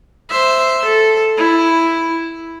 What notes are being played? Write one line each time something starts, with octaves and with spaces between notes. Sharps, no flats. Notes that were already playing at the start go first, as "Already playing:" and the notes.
C5 E5
A4
E4